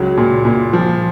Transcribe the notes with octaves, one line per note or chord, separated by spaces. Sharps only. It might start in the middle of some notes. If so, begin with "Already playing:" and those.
Already playing: C#2 F#3
A#2
A#2
F3